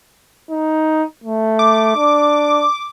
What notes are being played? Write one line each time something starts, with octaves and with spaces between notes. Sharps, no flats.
D#4
A3
D6
D4